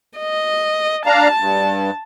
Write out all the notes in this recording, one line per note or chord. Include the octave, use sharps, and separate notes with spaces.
D#5
D4 F5 A5 A#5
G2